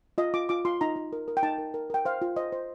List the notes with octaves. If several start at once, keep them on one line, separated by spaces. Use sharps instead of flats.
F4 D#5
F4 D6
F4 D6
F4 C6
D#4 A#5
D#4
A#4
A#4
G5
D#4 A5
A#4
A#4
A#4 G5
C5 F5
F4
C5 D#5
C5